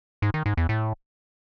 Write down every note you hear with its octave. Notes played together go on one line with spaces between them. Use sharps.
G#2
D#3
G#2
E2
A2